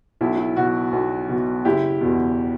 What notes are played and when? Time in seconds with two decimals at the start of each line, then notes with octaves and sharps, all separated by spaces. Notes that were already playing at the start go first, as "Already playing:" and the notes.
0.21 B1 E4
0.36 E4
0.57 B2 F#4
0.92 B1
1.29 B2
1.65 F#1 E4 G4
2.01 E2 B2